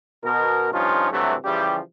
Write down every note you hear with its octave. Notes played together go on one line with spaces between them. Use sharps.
B2 A#4
G2 F3 C#4 D#4 F4
G2 C3 E3 F#3 A3
C#3 E3 F3 G3 G4